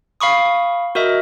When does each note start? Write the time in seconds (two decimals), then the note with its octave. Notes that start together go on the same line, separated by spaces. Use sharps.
0.20 F5 B5 C#6 D#6
0.95 F#4 A#4 D#5 E5